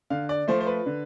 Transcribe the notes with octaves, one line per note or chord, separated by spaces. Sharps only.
D3 F5
D5
F3 A3 C5
C5
B4
D3